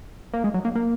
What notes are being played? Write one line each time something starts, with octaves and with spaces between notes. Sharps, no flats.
A#3
G#3
F#3
A#3
A#3